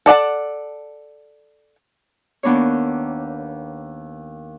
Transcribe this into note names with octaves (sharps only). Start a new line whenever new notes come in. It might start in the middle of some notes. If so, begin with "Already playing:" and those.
A4 D5 F#5 A5
D#2 B3 D4 A#4 C#5